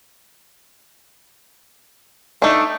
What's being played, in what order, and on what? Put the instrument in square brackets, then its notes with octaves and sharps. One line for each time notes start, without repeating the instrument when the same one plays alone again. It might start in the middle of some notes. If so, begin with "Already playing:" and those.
[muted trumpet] A3 [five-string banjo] D4 D#4